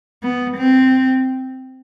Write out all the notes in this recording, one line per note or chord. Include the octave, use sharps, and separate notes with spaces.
B3
C4